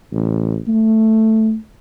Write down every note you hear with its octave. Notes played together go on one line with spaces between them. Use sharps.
A1
A3